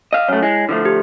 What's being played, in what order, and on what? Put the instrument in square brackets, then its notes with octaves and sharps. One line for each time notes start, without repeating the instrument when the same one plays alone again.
[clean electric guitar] D#5 F5
[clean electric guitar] F#2 A3 [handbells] C#5
[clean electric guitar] G#3 [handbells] E4
[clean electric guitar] D3 F3 A3
[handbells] G4